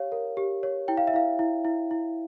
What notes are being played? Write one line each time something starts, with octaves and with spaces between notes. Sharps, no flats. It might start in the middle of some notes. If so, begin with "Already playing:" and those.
Already playing: G4 C#5 F5
A#4
G4
C#5
E4 G5
F5
E5
E4 F5
E4
E4
E4